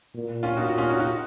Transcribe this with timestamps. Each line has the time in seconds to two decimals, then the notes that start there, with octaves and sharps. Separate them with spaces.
0.15 A#2
0.43 C#4 F4
0.57 A#2 D#4 F#4
0.67 D#4 F#4
0.78 C#4 F4
0.89 D#4 F#4
0.99 D#4 F#4